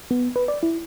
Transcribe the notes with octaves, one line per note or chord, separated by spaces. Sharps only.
B3
B4
D5
E4